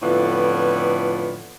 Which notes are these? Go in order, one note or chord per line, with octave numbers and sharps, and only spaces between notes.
F2 A2 D3 E3 B3 F4